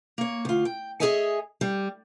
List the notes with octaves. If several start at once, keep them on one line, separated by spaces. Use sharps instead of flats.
A#3 C#5
D2 F4
G5
G#4 A#4 C#5 D#5 E5 G#5
G3